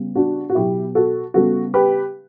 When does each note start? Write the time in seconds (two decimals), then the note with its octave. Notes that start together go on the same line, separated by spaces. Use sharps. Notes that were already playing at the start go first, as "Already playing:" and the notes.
Already playing: C#3 G3 B3
0.15 D4 F#4
0.50 F#4
0.55 B2 F#3 B3 E4 G4
0.95 F#4 A4
1.34 C#3 G3 B3 F#4 A4
1.74 G4 B4